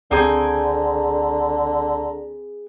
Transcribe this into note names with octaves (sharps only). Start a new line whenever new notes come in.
C#2 D3 C4 G#4 G5 A#5